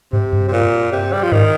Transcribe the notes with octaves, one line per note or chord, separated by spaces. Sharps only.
G#2 C3
G2
C3
A#2
C3
G3
F3
G#2 D#3